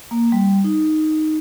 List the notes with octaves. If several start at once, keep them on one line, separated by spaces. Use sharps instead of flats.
A#3
G3
D#4